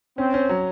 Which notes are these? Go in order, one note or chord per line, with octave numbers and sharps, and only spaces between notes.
C4 C#4
C#4
F#3